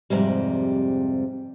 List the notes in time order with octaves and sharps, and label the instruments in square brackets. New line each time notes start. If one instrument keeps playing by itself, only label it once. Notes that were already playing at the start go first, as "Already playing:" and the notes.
[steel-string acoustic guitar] F2 G#2 C3 G3